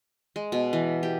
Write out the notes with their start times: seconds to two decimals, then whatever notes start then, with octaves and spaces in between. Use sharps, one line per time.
0.36 G#3
0.52 B2
0.73 E3
1.03 G4